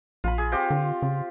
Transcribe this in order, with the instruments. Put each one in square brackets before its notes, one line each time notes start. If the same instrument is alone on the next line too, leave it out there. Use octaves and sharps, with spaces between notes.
[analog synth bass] A#1 [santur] F4 B5
[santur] G#4
C4 F4 G4
[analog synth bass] D3
C#3